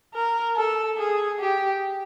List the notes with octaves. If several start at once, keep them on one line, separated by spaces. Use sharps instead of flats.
A#4
A4
G#4
G4